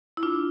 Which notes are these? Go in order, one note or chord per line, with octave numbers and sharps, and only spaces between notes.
E4
D4 F4